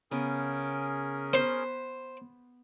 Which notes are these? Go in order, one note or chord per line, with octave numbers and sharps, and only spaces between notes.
C#3 B3 C#4 G#4 A#4
B3 B4 C5